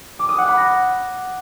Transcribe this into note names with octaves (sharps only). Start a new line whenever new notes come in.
D6
D#6
F#5
B5
A#6